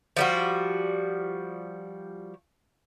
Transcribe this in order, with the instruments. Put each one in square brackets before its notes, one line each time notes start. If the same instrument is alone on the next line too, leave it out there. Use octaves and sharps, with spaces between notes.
[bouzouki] F3 G3 F#4